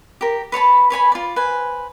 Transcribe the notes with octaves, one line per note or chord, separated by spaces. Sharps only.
G4 A#4
B4 C#5 A5 B5
B4 C#5 G#5 B5
F4 D5
B4 C5 G#5